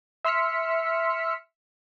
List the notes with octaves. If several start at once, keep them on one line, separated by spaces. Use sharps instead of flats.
E5 C6 E6 F6 B6 C#7